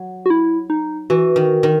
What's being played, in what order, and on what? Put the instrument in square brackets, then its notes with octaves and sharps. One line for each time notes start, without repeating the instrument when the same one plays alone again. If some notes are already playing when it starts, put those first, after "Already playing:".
Already playing: [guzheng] F#3
[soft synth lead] F#4
E4
D#4
[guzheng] E3 [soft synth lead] F#4
[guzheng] D#3
D#3